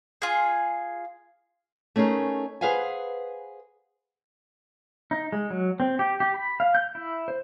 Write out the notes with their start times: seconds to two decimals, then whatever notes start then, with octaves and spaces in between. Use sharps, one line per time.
0.22 F4 G#4
1.96 A3 C#4 D#4 G#4 A#4
2.61 G#4 B4 C5 F5 F#5 G#5
5.11 D#4
5.32 G#3
5.51 F#3
5.80 C4
5.99 G4
6.20 G4
6.34 B5
6.60 F5
6.75 G6
6.95 E4
7.28 C5